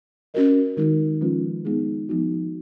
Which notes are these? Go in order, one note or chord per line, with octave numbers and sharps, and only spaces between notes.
C#4 F#4 A#4 D#5
D#3 G#3 D#4 A#4
F3 G#3 C#4 F4 B4
G#3 B3 D#4 G#4
F3 B3 D#4 F#4